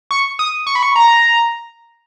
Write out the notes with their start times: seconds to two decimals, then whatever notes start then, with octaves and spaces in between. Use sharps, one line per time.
0.11 C#6
0.39 D#6
0.67 C#6
0.75 B5
0.83 C#6
0.96 A#5